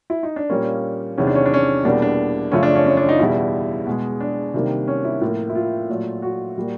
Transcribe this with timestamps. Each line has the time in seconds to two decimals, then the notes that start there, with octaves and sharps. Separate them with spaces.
0.10 E4
0.23 D#4
0.36 D4
0.50 A#2 G3 A#3 C#4
1.18 E2 C3 D#3 C#4
1.27 D4
1.35 C#4
1.46 D4
1.54 C#4
1.84 E2 B2 G3 A#3 D4
2.02 D4
2.52 F#2 C#3 F3 A3 C#4
2.63 D4
2.75 C#4
2.86 C#4
2.97 D4
3.09 D#4
3.19 E2 B2 G3 E4
3.87 B2 G#3
4.20 D4
4.54 C3 D#3 G3 A#3
4.88 C#4
5.04 E4
5.21 A2 F3 A#3 F4
5.50 E4
5.55 F4
5.89 A#2 F#3 A3
6.22 F#4
6.57 A#2 G3 A#3